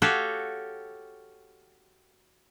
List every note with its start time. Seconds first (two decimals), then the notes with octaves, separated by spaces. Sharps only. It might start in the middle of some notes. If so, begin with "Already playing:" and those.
0.02 F#4 G4 A4 C#5 F5